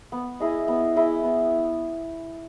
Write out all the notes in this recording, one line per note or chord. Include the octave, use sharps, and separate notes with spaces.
B3
E4 G#4 D#5
B3
E4 G#4 D#5
B3